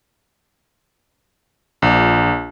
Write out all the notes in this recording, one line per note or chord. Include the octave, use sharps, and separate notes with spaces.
A#1